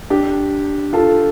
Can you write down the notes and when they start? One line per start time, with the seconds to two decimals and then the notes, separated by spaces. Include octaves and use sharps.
0.10 D4 G4
0.93 F4 A4